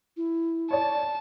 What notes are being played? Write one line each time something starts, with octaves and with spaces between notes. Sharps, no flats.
E4
C#5 D5 A5